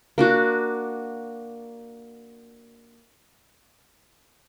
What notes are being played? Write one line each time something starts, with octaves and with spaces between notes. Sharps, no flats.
A#3 D4 F#4